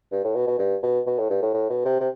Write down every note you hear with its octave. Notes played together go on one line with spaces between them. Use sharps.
G2
A2
B2
B2
G2
B2
B2
A2
G2
A2
A2
B2
C3
C3